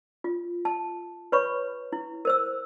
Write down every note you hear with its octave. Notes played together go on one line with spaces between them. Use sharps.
F4
A5
B4 C#5 B5 C#6
E4
A#4 C5 E6